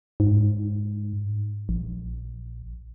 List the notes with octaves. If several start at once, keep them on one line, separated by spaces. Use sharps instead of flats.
G#2
A#1